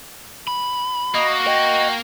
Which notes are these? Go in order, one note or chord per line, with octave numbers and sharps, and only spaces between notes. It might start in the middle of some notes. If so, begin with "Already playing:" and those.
B5
A#3 F#4 D#5
D#5 G5